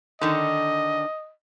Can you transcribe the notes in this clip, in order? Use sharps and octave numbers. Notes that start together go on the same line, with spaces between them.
D3 D#3 D#5